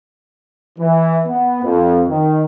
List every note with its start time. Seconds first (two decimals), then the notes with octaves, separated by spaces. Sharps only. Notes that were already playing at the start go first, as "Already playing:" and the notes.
0.79 E3
1.27 B3
1.63 F2
2.09 D#3